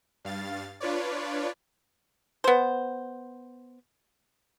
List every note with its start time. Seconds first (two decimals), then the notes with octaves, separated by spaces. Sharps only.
0.25 G2 F5 A6
0.80 D4 F4 B4 C#5 D5
2.44 B3 C5